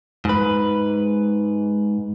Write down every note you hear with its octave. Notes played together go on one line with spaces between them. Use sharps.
G#2 B4